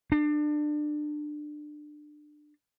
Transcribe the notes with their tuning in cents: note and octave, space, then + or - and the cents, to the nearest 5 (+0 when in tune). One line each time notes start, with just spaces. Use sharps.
D4 +25